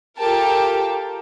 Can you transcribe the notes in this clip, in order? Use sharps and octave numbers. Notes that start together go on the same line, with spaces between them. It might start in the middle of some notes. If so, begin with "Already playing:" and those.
F4 G4 A4 A#4 G5 A5